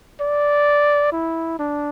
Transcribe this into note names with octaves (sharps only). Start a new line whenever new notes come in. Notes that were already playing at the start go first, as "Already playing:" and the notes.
D5
E4
D4